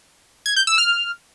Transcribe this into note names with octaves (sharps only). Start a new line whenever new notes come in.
G#6
G6
E6
F6